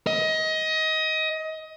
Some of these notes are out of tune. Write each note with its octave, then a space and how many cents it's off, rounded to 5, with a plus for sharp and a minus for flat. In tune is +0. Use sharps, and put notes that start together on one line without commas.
D#5 +25